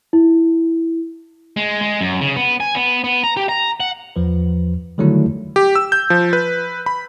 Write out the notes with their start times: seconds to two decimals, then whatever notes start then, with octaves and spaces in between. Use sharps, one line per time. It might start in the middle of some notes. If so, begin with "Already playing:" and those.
0.13 E4
1.57 G#3
1.81 G#3
2.01 F#2
2.21 C#3
2.36 B3
2.60 G#5
2.75 B3
3.04 B3
3.23 A#5
3.37 G4
3.49 A#5
3.80 F#5
4.16 E2 F3 B4
4.98 D3 D#3 F#3 G3 A3 E4
5.56 G4
5.76 E6
5.92 G6
6.10 F3
6.33 B4
6.86 B5